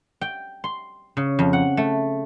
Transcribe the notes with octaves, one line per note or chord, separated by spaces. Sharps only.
G5
C6
C#3
F2
F#5
A3